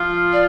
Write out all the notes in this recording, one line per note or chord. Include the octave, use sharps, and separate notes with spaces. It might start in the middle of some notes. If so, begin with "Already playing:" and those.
Already playing: F3 F4
D5